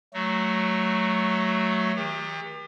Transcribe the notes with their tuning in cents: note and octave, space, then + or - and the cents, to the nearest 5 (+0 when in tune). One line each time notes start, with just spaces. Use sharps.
F#3 +10 A3 +0 F#4 +5
D#3 +45 G4 +40